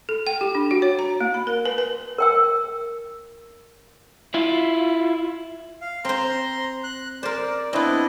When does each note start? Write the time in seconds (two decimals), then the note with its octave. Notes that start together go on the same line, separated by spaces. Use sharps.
0.09 A4
0.27 G5
0.41 G4
0.55 D4
0.71 F#4
0.82 C#5
0.99 A#5
1.21 A#3
1.34 B5
1.47 A#4
1.65 B4
1.78 B4
2.18 A#4 G5 E6
4.34 E4 F4
5.81 F5
6.05 C4 C5 A#5 C6
6.84 F#6
7.23 A#4 C5 D5
7.73 B3 C4 D4 E4 D#5